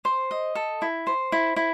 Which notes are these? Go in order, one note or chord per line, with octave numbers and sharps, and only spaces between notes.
C5
D#5
A4
E4
C5
E4
E4